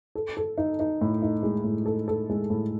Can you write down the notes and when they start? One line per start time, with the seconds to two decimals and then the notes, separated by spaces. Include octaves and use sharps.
0.15 A4
0.37 A4
0.58 D#4
0.80 D#4
1.01 A2
1.22 D#4
1.43 G#3
1.64 A2
1.86 A4
2.08 A4
2.30 G#3
2.50 A2